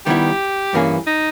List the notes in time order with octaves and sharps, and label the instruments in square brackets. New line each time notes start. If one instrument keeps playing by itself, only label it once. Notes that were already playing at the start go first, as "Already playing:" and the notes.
[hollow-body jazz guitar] D#3 G3 B3 E4 [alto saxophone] G4
[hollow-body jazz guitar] G2 E3 A#3 C#4 G#4
[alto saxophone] D#4